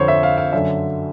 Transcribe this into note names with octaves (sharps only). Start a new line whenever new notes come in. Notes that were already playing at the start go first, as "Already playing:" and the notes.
Already playing: F2 D3 C5 C#5
E5
F5
F5
F#2 D3 E5